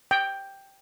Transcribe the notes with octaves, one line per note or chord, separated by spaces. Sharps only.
G5